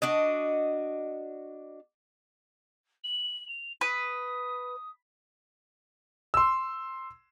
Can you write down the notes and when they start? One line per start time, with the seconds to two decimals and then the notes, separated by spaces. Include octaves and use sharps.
0.02 D4 F#4 D#5
3.03 F#7
3.48 F7
3.81 B4 D#6
6.34 C6 E6